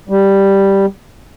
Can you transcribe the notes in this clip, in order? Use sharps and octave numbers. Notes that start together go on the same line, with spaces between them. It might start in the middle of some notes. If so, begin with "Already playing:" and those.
G3